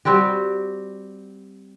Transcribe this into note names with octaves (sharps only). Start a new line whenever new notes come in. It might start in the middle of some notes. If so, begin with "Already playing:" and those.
G3 C4 F#4 G4